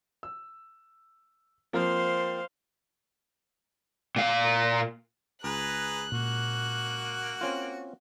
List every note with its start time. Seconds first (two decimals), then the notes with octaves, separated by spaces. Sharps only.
0.23 E6
1.73 F3 A#3 C4 C5 F5
4.16 A#2 F5
5.44 C#2 G#4 B4 A#5 F#6
6.12 A#2 A#3 F#4
7.41 C4 C#4 F4